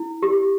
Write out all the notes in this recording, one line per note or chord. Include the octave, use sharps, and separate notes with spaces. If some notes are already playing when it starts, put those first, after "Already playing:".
Already playing: E4
G4